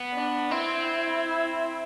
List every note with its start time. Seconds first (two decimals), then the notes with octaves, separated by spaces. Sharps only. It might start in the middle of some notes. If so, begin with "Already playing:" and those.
Already playing: B3
0.14 D4
0.51 C4 E4